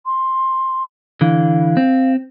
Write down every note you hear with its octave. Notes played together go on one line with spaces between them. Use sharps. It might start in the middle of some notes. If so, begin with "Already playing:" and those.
C6
D3 E3 F5
C4